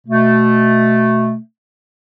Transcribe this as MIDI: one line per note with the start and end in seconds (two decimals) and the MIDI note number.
0.07 1.36 47
0.07 1.36 57